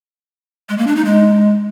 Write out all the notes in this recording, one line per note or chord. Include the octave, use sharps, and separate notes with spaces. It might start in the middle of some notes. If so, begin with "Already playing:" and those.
G#3
A#3
D4
D#4
G#3